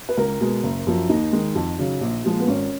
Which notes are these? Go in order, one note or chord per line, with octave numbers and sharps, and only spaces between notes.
B4
C#2 A#4
B2 G#3
F#1
F#2 F3
D#2 D#4
D#3 G#3
F2
C#3 F#3
A#1
A#2 F3 G#3
B3
G#1 C#4